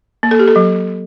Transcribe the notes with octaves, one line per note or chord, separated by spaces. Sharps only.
A#3
A4
G4
A4
F#3